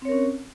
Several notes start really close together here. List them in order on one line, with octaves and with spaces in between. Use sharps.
C4 C#5 A#4 C#4